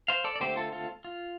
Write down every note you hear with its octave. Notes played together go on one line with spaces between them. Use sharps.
C5 F5
A4 D5
D5
D3 A3 C4 G4 C5
F4 A4
F4 A4
F4